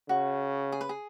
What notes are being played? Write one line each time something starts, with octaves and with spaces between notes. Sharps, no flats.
C#3 F#4
G#4
B4
G#4